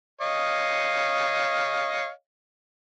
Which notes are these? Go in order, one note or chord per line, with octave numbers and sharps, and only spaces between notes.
C#5 D#5 F5